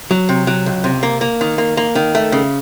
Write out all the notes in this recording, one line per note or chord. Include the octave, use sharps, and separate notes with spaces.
F#3
C3
F#3
C#2
C3
A#3
A#3
D#3
A#3
A#3
D#3
A3
C#3